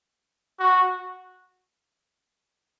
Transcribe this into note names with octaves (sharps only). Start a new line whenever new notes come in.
F#4